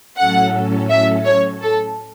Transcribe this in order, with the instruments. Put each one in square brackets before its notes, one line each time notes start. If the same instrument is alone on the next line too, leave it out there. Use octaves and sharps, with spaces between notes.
[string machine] A2 F#3 C#4 A4 [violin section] F#5
[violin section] E5
C#5
A4